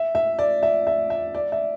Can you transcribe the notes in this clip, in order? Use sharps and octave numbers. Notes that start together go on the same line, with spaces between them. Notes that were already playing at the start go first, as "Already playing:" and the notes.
Already playing: E5
E5
D5
E5
E5
E5
D5
E5